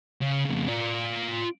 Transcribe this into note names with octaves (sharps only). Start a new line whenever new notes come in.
C#3
F2 C#3
F4 D5